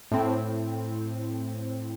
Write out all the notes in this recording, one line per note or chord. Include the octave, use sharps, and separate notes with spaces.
A2 C4